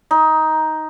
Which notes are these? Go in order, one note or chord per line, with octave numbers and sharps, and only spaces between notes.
D#4